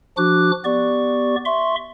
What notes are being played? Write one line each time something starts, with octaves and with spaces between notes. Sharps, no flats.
F3 D4 F#4 D6 F#6
B3 G4 D5 C#6
E5 C6 C#6